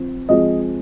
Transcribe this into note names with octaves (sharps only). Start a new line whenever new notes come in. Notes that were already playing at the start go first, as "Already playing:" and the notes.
Already playing: F3 C4
F3 G#3 C4 D#5